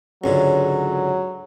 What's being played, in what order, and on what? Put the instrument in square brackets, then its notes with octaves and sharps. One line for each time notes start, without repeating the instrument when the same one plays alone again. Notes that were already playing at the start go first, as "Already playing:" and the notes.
[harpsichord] C#2 G#2 D3 [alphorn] F#3 [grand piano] C#4